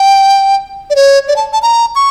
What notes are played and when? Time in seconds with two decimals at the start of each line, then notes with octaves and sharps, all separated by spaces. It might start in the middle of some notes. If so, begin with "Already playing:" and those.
Already playing: G5
0.90 D5
0.96 C#5
1.28 D5
1.36 A5
1.53 A5
1.62 A#5
1.95 C#6